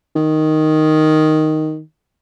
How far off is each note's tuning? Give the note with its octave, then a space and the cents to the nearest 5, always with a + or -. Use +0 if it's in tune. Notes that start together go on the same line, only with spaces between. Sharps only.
D#3 +0